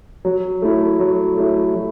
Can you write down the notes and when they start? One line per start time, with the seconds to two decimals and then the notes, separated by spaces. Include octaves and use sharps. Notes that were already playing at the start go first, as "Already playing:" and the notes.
0.25 F#3
0.62 A3 E4
0.99 F#3
1.37 A3 E4
1.74 F#3